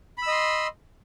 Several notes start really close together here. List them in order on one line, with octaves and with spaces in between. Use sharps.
B5 E6 D#5 C6